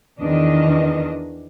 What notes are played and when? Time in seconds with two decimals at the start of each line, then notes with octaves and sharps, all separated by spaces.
0.20 E2 D#3 D4 D#5